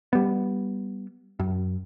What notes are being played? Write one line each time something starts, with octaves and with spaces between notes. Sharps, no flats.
G3 B3
F#2